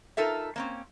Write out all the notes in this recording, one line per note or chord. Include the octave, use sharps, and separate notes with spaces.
D#4 F4 A4 A#4 E5
A#3 C4 C#4